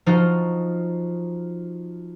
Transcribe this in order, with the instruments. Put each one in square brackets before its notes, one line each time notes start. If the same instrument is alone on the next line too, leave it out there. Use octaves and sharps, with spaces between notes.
[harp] F3 D#4 F4 F#4